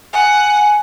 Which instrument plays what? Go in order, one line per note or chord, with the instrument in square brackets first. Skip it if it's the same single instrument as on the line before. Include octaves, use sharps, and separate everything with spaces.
[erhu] F#5 [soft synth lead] G#5